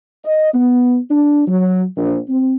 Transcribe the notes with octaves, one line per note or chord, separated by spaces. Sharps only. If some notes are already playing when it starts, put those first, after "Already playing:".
D#5
B3
D4
F#3
A#1
C4